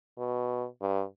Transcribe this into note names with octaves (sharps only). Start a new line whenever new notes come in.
B2
G2